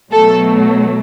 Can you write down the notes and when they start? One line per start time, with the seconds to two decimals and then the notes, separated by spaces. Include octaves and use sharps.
0.11 B2 F#3 A3 A4